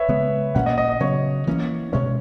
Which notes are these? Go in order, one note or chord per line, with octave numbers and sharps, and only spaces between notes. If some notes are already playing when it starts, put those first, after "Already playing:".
Already playing: B4 C#5 E5
C#3 G#3 B3
A#2 A#3 C#4 F#5
D#5
D#5
D#5
C#3 F#3 B3 C#5
E3 A#3 C#4
B2 G#3 C#4 C#5